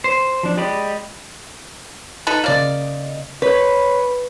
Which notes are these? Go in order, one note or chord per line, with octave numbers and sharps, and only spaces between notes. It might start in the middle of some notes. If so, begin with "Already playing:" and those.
C5
F3 D4
G#3 G4 D5 D#5 B5
D#4 A4 B4
C#3 A#3 D5 D#5
B4 C#5